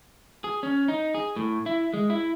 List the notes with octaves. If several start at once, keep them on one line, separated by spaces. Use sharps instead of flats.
G#4
C#4
D#4
G#4
A2
E4
G#3
E4